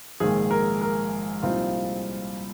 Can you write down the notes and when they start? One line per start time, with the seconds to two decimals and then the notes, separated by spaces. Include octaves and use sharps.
0.20 A#1 G#2 D#3 A#3 G#4
0.51 A#4
0.81 A#4
1.42 C2 A#2 F3 C4 D#4 F4